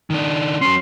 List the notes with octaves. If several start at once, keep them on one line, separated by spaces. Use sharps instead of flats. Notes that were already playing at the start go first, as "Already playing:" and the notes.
D#3 D4
F#3 C#4 C6